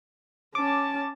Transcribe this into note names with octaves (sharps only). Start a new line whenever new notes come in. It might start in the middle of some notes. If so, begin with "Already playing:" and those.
C#4 A5 D6